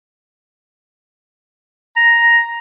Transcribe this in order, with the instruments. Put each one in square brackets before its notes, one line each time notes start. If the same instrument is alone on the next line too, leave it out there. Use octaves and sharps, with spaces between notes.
[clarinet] A#5